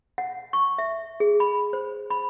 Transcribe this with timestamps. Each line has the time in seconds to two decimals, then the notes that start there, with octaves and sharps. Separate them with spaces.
0.18 F#5
0.53 C#6
0.78 E5
1.20 G#4
1.40 B5
1.73 C5
2.10 B5